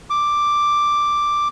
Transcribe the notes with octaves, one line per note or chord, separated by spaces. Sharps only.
D6